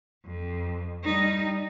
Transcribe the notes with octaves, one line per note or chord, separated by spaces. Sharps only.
F2
G3 D#4